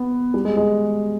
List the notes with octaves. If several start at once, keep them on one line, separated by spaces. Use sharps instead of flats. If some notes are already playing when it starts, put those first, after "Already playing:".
Already playing: B3
G3
G#3
G#3